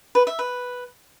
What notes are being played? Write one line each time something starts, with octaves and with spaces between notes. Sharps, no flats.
B4
E5
B4